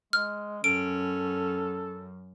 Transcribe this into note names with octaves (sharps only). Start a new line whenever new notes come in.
G#3 F6
F#2 C#4 A4 D7